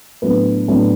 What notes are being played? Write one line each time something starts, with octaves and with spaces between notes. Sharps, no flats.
A2 F#3 B3 D4 B4
A2 F#3 B3 D4